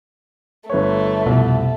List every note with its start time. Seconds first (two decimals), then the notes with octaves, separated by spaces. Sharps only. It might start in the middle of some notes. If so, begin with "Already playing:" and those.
0.70 G1 A3 B4 C#5
1.26 C2 F2 B2